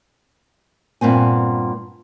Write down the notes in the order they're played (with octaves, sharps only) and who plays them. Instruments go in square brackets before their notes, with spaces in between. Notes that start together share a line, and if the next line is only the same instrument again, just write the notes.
[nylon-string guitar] G2 A#2 B3 C4 G#5